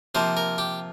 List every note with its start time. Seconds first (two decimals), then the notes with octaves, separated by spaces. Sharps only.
0.15 C3 F3 A#3 C5
0.37 A#4
0.58 G4